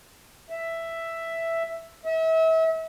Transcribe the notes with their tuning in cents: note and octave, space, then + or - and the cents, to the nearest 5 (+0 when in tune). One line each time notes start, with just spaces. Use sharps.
E5 +5
E5 -35